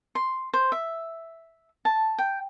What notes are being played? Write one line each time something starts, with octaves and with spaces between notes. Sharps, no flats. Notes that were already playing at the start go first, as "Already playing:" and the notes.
C6
C5
E5
A5
G5